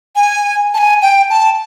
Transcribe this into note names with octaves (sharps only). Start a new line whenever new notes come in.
G#5
A5
G#5
G5
A5